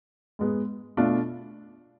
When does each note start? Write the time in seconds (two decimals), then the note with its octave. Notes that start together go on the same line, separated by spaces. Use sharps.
0.39 G#2 G#3 B3
0.97 B2 A3 D4 F4